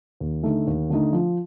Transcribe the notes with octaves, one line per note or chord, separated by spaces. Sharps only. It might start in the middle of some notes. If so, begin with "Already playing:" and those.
D#2
D3 A3 D#4
D#2
D3 A3 D#4
F3